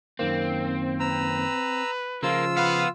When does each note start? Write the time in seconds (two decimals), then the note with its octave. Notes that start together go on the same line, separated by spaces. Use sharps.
0.19 F#2 D#3 A#3 C4
1.00 B4 A#5 E6
2.23 C#3 F3 A#3 F4 E6
2.56 B3 B4 F5